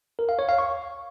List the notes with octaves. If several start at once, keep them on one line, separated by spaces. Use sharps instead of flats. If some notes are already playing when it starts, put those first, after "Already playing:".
A#4
F5
C#5
F5
C#6